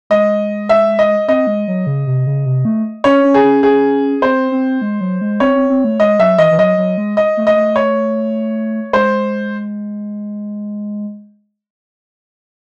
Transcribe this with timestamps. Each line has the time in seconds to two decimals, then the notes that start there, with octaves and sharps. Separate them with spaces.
0.10 G#3 D#5
0.69 E5
0.99 D#5
1.28 C4 D#5
1.47 G#3
1.68 F#3
1.87 C#3
2.07 C3
2.27 C#3
2.46 C3
2.65 A3
3.04 C#4 C#5
3.24 C#4
3.34 G#4
3.43 C#4
3.63 G#4
4.22 C4 C5
4.52 C4
4.82 G#3
5.01 F#3
5.21 G#3
5.40 C4 C#5
5.55 C4
5.70 C4
5.84 A3
5.99 G#3 D#5
6.19 F#3 E5
6.38 E3 D#5
6.51 E3
6.58 F#3 D#5
6.78 F#3
6.98 G#3
7.17 D#5
7.37 A3
7.47 D#5
7.56 A3
7.76 C#5
8.93 G#3 C5